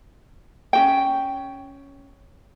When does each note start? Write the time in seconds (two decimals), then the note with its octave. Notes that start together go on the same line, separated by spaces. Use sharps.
0.73 C#4 F#4 G5